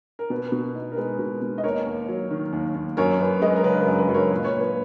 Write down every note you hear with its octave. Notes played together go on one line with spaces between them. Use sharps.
A#4
B2 B4
B2
D#4
A#4
G#3 B4
B2
B2
D#5
D#2 A#4 C#5
D#2
F#3
D#3
D#2
D#2
F#2 A#4 C#5
F#2 B4
G#3 B4 D#5
A#4
C#3 B4
F#2 A#4
B4
F#2
A#4 C#5
A#2 B4
C#5
A#2
B4